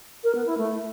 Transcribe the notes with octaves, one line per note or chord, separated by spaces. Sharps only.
A#4
B3
E4
A3